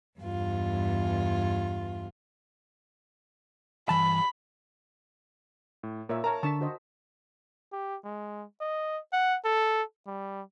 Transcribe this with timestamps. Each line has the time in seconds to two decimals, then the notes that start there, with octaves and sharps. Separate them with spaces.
0.18 E2 G2 F4
3.89 G2 E3 A5 B5
5.83 A2
6.09 A#2 A#4 C#5 E5
6.24 A#4 C#5 A5 A#5
6.43 D3 D4 A5 C#6 B6
6.61 F#4 C5 D#5
7.72 G4
8.04 G#3
8.61 D#5
9.12 F#5
9.45 A4
10.07 G3